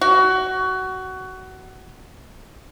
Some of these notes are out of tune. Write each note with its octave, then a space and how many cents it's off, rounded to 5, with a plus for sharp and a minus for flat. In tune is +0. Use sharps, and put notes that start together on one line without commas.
F#4 +20